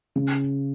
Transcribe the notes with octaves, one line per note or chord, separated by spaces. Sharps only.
C#3